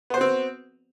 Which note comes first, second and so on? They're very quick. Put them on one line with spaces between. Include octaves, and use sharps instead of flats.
B3 C5 F#4 C4